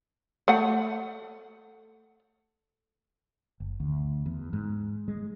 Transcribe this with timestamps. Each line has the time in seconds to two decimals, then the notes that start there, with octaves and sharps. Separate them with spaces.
0.48 A3 F#5
3.60 F#1
3.80 D2
4.26 E2
4.53 G#2
5.08 G#3